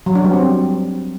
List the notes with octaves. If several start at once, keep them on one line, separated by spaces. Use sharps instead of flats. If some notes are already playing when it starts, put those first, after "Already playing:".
F#3
D4
G3
C4